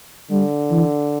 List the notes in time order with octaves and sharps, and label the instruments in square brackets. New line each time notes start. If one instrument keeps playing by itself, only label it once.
[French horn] D3 [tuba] G3
[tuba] E3